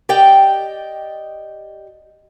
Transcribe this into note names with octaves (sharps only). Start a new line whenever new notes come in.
G4 D5 D#5 G5